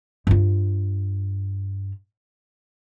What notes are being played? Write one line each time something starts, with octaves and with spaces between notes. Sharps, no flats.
G2 F4